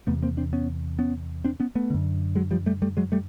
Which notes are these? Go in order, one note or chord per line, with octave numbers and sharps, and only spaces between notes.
E2 C3 A3 B3
A#3 C4
C4 D4
B3 C#4
B3 C#4
C4 D4
B3 C#4
A3 B3
F#2 D3
F#3 G#3
F3 G3
G3 A3
G3 A3
F#3 G#3
G3 A3